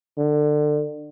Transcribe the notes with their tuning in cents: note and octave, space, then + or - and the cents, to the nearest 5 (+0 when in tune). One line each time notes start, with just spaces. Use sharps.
D3 +25